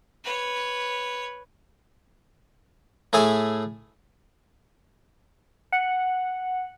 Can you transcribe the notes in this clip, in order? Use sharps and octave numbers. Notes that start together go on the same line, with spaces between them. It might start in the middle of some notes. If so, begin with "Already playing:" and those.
B4 C#5
A2 A3 G#4 A4 G#5
F#5